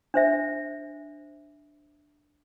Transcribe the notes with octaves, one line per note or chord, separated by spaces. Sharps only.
D4 C5 E5